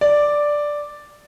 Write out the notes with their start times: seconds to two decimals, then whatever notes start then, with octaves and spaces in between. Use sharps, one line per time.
0.01 D5